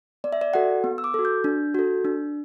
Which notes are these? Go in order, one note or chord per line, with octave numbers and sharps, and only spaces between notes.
B3 D5
E5
D5
F#4 A4 F#5
B3
E6
D6
F#4 A4
G6
D4
F#4 A4
D4